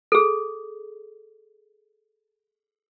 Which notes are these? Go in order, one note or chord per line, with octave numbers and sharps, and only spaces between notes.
G#4 A4